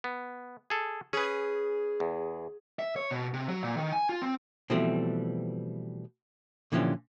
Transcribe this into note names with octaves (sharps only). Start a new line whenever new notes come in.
B3
G#4 A4
C#4 G#4 B4
E2
E5
C#5
B2
C3
F#3
A#2
D#3
G#5
F4
C4
B2 E3 F3 G3 A3 C4
A#2 D3 E3 F3 C#4 G4